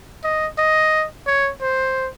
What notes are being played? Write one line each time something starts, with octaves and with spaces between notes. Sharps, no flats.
D#5
D#5
C#5
C5